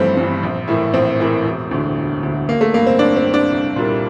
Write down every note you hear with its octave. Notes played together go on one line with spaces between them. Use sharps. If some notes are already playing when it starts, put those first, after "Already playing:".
Already playing: G1 G2 E3 F3 G3 A3 C4
G2 E3
A#1
A2 E3 A#3 E4
A#1 C4
A2 E3 A#3 E4
E1
D2 D3
E1
D2 D3
A1 A#3
A3
G2 D3 A#3
C4
A1 D4
C4
G2 D3
D4
C2
A#2 G3 A#3 E4